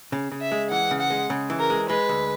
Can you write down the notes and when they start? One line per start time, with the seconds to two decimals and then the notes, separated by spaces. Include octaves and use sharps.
0.12 C#3
0.31 C#3
0.41 E5
0.52 G#3
0.71 E3 F#5
0.91 C#3
1.00 F#5
1.10 G#3
1.30 C#3
1.50 E3
1.60 A#4
1.70 G#3
1.89 G#3 B4
2.09 D2